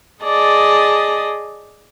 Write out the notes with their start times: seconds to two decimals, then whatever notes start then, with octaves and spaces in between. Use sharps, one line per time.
0.22 G#4 D5 D#5 A5